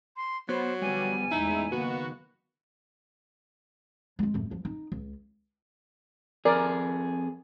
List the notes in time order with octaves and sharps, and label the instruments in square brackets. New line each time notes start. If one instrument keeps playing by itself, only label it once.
[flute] C6
[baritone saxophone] F#3 [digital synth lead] B3 [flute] C5
[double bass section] D3 F3 B3 [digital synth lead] G3 [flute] G#5
[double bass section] A1 E2 G#3 [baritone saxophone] D#4 [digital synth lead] E4
[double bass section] F#1 D#3 A#3 [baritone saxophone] B3 [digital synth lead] F#4
[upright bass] F2 G#3
D1 F#2
E2 F3
D#4
C#2
[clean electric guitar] F2 G#4 [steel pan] A#4 D5